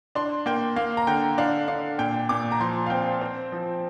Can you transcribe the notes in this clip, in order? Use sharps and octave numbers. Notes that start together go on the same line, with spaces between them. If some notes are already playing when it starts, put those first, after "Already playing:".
D4 C6
A#3 G5
A#3 F5
A#5
D3 G5
D4 F5
D4 F5
A#2 G5
A#2 D6
A#5
F3 C6
F5
C4 G5
C4
F3